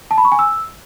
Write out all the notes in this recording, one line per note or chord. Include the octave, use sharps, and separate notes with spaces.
A5
B5
C#6
G#5
E6